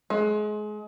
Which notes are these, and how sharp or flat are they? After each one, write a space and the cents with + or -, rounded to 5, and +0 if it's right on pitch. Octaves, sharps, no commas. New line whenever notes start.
G#3 +30